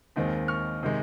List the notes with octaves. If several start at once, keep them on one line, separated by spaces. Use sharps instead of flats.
D#2 D#3 G#3 C4
C#6 F6
C3 D#3 G#3